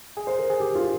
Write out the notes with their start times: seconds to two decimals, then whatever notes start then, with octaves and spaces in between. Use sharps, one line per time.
0.17 G#4
0.27 C5
0.39 A#4
0.50 G#4
0.60 G4
0.75 F4